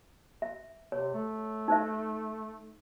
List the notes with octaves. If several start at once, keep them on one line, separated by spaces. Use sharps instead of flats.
E5
C3 C#5
A3
D#4 C5 E5